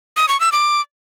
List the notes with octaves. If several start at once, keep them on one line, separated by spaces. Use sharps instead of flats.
D#6
C#6
E6
D6